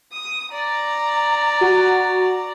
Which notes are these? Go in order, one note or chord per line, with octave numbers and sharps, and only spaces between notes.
D#6
D5 A#5
F#4